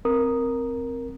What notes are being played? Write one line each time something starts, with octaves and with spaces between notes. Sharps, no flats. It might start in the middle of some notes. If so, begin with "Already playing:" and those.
C4 A#4 D#6